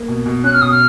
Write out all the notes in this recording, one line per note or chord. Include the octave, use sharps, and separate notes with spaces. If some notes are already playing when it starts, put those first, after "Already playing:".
Already playing: A#3
B2
B2
C#4 F#6
F6
B2 D#6
F6